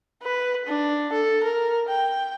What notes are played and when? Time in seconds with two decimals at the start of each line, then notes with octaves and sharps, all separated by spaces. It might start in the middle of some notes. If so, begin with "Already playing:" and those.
0.23 B4
0.67 D4
1.13 A4
1.44 A#4
1.89 G5